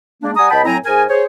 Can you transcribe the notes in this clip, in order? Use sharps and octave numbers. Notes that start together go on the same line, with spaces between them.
G#3 A#3 D4
G3 F#5 G#5 A#5 D#6
C#2 D#5 G5 A5 B5
A2 F#3 C4 E4 G#5 A#5
G#2 G#4 A#4 G#5
G#4 C5 C#5